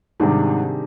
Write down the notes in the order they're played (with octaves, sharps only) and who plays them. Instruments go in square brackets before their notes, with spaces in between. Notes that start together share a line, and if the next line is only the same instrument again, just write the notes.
[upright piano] G#2 [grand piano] C3 D#3 G3 D4 G#4